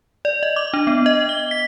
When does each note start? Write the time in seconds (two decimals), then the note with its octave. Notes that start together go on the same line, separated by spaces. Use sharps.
0.25 D5
0.43 D#5
0.56 D6
0.74 D4
0.87 B3
1.06 D#5
1.29 G7
1.51 B6